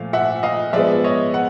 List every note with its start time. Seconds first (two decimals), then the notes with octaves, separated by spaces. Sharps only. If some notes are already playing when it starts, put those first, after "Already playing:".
Already playing: A#2 F3 A3 F5
0.13 E5 F#5
0.43 D#5 F5
0.73 F3 G#3 B3 D5 E5
1.04 C#5 D#5
1.34 F#5